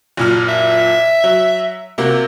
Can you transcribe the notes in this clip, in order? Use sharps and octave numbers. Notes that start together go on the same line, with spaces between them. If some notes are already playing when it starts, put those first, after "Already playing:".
F#1 A#2 F6
E5
F#3
C3 A#3 F#4